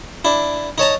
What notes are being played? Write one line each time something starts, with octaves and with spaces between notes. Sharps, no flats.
D4 E4
D#4 C#5 A5 A#5